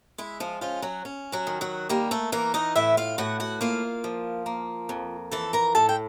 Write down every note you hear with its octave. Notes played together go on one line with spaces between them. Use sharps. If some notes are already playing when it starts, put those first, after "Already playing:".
G#3 E4
F3 F4
F3 C#4 F4
F#3 F#4
C#4
F#3 F#4
D#3
F#3 F#4
G3 A#3 G4
A3 A4
E3 A#3 A#4
D#4 D#5
A2 E4 E5
F4 F5
A2 F#4 F#5
F#4 F#5
A#3 F4 F5
F3
A#3
F2
E3 A4 A5
A#4 A#5
A2 A4 A5
G5